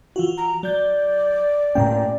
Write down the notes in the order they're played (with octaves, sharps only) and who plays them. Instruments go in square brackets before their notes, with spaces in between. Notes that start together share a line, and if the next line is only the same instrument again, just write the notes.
[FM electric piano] E3 F4 F#4
[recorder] A#5
[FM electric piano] F#3 G6 [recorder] D5
[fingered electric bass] A2 A#3 C#4 [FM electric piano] G5 A#5